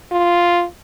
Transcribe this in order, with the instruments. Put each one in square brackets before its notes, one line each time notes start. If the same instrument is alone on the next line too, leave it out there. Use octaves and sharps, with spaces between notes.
[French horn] F4